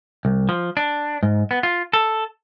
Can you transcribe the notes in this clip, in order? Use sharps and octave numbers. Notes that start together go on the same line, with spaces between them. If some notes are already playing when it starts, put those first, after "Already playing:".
C2
F3
D4
G#2
B3
F4
A4